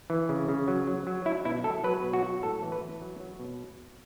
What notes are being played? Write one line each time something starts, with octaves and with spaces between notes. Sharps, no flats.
E3
C#3
C#3
F#3
F#3
F#3
F#3 E4
B2 E4
F#3 A4
F#3 B4
B2
F#4
F#3
A2 A4
E3
B4
E3
F#3
F#3
B2